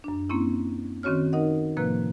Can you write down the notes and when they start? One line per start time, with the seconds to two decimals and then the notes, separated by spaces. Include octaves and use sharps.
0.04 F#2 D4
0.29 A#3 C4 C#4 E4
1.03 D#3 C4 C#4 F#4 C#5 F6
1.33 D#4 A#4 D#5 F#5
1.77 A2 C3 F3 A#3 B4 F#6